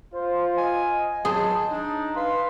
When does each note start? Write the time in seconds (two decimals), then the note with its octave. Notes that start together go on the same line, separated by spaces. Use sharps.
0.14 F4 C5
0.57 D#5 G#5
1.25 F#3 G#4 C5 A5
1.71 D4 D#4
2.16 B4 F5 C6